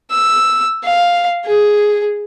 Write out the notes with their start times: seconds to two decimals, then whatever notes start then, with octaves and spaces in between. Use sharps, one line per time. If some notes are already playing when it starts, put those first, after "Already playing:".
0.10 E6
0.83 F5
1.45 G#4